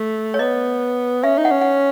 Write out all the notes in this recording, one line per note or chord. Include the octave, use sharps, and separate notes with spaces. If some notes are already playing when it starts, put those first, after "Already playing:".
Already playing: A3
C#5
B3 D#5
C#4 E5
D#4
F#5
C#4
F#5